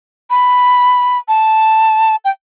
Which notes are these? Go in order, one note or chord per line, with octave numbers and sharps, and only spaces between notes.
B5
A5
G5